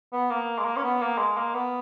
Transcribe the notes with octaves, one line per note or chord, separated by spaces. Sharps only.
B3
A#3
G#3
A#3
C#4
B3
A#3
G#3
A#3
B3